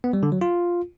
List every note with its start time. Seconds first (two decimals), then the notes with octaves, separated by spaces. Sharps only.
0.04 B3
0.13 G3
0.23 D3
0.32 F#3
0.41 F4